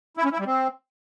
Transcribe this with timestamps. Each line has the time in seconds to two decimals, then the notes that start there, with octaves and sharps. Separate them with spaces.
0.17 E4
0.24 C#4
0.32 E4
0.39 G3
0.46 C4